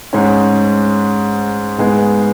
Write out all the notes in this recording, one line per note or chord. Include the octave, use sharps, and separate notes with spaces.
G#2 G#3 C#4
G#2 G#3 B3